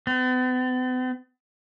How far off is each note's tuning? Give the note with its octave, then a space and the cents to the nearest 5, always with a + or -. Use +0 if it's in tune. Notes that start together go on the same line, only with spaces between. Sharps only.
B3 +45